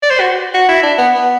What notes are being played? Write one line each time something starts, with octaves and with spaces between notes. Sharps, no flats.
D5
C5
F#4
F#4
E4
D4
B3
B3